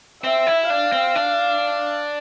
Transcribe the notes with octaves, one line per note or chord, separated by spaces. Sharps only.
C4 E5
E4
D4 F5
C4
D4